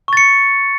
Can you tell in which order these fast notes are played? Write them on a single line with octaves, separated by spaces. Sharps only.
C#6 A6 C#7